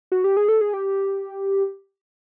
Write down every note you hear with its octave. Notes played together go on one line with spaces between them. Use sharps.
F#4
G4
G#4
A4
G#4
G4